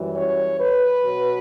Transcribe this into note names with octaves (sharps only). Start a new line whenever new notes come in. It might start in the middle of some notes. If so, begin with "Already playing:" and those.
Already playing: F#2 E3 G3
C#5
B4
B2 F#3